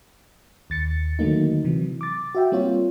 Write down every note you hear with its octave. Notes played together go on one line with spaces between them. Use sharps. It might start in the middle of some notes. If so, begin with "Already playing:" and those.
D#2 A6 C#7
D3 D#3 F#3 A3 A#3 D#4
C3 E3 F#3
D6 A6
F#4 E5 G5
G3 A#3 C4 F4 C#5